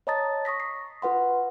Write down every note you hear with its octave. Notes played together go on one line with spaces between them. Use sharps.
C#5 D#5 A5 A#5 D#6 A6
C#6 D#6 A#6 B6
C7
F4 B4 F#5 C6